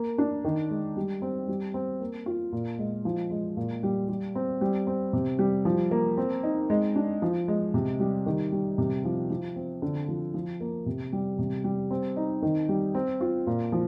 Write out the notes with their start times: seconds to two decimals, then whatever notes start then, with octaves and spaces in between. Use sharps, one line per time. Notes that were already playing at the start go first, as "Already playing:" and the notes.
Already playing: A#3
0.18 D4
0.44 D#3
0.70 G#3
0.96 G3
1.22 C4
1.48 G3
1.74 C4
2.01 A#3
2.26 F4
2.52 A#2
2.79 G#3
3.05 F3
3.31 G#3
3.57 A#2
3.83 G3
4.09 G3
4.35 C4
4.61 G3
4.87 C4
5.13 C3
5.39 G3
5.65 F3
5.91 A#3
6.18 C4
6.43 D#4
6.70 G#3
6.96 D4
7.22 F3
7.48 G#3
7.74 C3
8.00 G3
8.26 D#3
8.52 G3
8.78 C3
9.04 F3
9.30 F3
9.56 C4
9.82 D3
10.08 F3
10.34 F3
10.60 A#3
10.86 C3
11.13 G3
11.39 C3
11.64 G3
11.91 C4
12.16 D#4
12.42 D#3
12.69 G3
12.95 C4
13.21 F4
13.47 A#2
13.72 F3